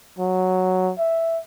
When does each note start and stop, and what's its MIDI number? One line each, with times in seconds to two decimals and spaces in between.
0.19 0.93 54
0.99 1.40 76